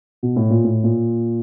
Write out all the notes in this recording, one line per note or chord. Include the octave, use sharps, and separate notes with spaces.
B2
A2
A#2
A2
A#2